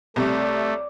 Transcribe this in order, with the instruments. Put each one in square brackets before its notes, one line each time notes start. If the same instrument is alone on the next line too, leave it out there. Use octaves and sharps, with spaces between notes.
[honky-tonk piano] C2 C3 [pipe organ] A3 [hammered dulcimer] C#5 D5